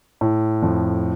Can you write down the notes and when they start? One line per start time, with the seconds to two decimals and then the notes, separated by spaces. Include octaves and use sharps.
0.21 A2
0.62 F2